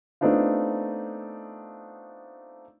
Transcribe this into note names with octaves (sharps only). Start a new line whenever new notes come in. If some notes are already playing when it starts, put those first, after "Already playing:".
A3 B3 C4 D4 D#4 F4